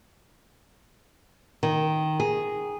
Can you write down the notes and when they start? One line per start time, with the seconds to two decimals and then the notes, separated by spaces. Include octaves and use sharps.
1.63 D#3
2.20 G#4